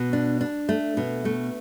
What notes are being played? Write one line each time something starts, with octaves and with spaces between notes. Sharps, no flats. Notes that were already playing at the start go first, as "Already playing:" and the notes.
Already playing: B2
D4
D4
A3
B2
A3